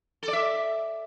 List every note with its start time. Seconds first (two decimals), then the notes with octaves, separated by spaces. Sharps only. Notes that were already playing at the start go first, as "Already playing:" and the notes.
0.23 A4
0.28 D5
0.33 E5